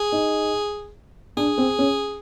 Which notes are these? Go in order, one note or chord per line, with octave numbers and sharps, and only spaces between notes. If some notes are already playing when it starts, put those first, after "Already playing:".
Already playing: G#4
D#4
D4 G#4
C4
C#4